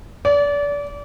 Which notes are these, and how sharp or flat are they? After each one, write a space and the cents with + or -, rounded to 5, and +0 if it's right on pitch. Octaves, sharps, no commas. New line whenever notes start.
D5 -30